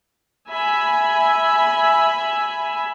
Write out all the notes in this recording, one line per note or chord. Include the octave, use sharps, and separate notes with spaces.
E5 G#5 B5